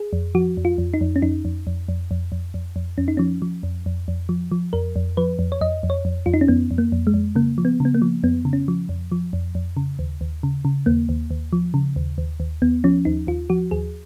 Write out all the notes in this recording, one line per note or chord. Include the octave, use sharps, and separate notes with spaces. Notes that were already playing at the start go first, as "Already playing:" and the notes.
Already playing: G#4
F2
F3 F#4
F2
F4
F2
D#4
F2
C#4
F2 D#4
F2
F2
F2
F2
F2
F2
F2
F2 C#4
D#4
F3 C#4
F3
F2
F2
F2
F3
F3
F2 A#4
F2
F3 B4
F2
C#5
F2 D#5
F2
C#5
F2
F2 F4
D#4
C#4
F2 B3
F2
A#3
F2
G#3
F2
C#3 A#3
F3
B3
C#3 B3
A#3
F3
F2 B3
C#3
C#4
F3
F2
F3
F2
F2
C#3
D#2
D#2
C#3
C#3
D#2 A#3
D#2
D#2
F3
C#3
D#2
D#2
D#2
D#2 B3
F3 C#4
D#2 D#4
D#2 F4
F3 F#4
D#2 G#4